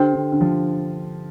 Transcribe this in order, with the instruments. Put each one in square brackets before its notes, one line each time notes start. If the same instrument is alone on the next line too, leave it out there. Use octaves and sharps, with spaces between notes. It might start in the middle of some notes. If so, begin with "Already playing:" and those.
Already playing: [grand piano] D3 [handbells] D4 G4 C5 G5
[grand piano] D3
D3
F3